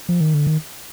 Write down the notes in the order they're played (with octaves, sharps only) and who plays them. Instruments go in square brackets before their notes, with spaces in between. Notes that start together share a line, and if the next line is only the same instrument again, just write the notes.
[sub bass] F3
D#3
D3
D#3